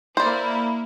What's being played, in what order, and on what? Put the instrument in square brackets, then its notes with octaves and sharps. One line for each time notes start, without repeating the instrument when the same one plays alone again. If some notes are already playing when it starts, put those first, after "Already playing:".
[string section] A#3 E4 [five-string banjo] C5 D5